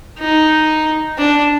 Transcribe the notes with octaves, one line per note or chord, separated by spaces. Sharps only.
D#4
D4